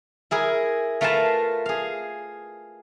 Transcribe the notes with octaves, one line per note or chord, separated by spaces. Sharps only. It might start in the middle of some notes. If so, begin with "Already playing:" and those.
E4 G#4 A#4
A3 F4 A#4 B4 F5 A5
G#4 F5